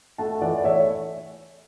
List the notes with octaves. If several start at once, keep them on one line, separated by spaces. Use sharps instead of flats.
A3 F#5 A5
E3 D5 F#5
A3 C#5 E5